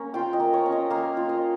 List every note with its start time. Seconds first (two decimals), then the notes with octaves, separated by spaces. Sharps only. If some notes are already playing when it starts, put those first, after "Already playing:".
Already playing: A#3 C#4
0.14 F4 G5
0.33 D#5
0.40 A#3
0.53 C#5
0.66 C#4
0.72 D#5
0.90 A#3 F5
1.17 F4
1.29 D#5